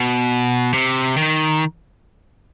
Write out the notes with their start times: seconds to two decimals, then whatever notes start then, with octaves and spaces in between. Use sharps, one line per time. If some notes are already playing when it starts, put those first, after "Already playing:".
Already playing: B2
0.74 C3
1.17 D#3